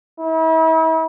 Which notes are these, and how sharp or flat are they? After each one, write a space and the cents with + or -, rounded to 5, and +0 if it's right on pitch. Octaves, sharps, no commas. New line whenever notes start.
E4 -40